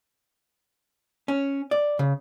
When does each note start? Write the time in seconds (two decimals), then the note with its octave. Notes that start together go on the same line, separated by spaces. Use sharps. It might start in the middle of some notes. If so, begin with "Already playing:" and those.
1.28 C#4
1.71 D5
1.99 C#3